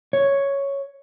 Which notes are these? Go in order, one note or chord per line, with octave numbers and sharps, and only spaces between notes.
C#5